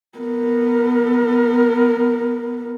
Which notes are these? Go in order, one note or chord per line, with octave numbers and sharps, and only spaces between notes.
B3 A#4